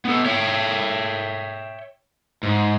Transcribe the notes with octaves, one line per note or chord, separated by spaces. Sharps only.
B3 A4
C#5 E5 G5
G#2